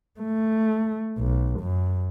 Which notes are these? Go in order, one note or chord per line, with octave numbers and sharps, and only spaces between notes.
A3
B1
F#2